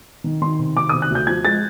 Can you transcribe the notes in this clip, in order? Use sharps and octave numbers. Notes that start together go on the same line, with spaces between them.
D#3
D#3 C6
C3
D#3 D6
C3 D#6
F#6
D2 G6
F3 G#6
G#3 A6